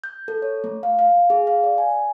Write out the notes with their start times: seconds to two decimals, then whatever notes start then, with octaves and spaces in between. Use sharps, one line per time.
0.04 G6
0.28 A4
0.42 C#5
0.64 A3
0.83 F5
0.99 F5
1.30 G#4
1.47 F5
1.64 D5
1.78 G#5